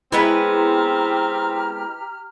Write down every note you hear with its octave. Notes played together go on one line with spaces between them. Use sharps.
G#3 B3 C4 E4 G4 B4 A#5 F6